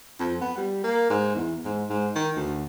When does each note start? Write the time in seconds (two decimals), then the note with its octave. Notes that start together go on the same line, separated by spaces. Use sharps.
0.19 F2
0.41 B3
0.57 G3
0.84 A#3
1.10 G#2
1.35 E2
1.65 G#2
1.89 G#2
2.16 D#3
2.36 D2